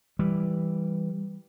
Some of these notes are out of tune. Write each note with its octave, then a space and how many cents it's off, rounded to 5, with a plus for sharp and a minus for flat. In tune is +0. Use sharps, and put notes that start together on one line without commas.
E3 +0 G3 +5